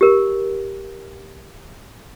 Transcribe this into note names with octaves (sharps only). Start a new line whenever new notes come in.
G4 A#4